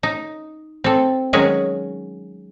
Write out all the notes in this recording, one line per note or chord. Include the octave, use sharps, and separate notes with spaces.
D#4
C4 A4
D#3 F#3 G#3 C#4 G#4